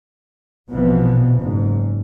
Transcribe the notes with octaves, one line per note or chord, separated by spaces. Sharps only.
A#1 B2 E3 F3 B3 C4
F#1 G#2